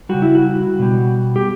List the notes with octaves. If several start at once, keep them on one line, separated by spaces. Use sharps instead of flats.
C#3 G3 F#4
E4
F#4
B2 G3
G4